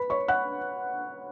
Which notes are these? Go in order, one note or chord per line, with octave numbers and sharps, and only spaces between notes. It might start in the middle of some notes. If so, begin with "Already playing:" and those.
Already playing: B4 B5
C#5 C#6
F#5 F#6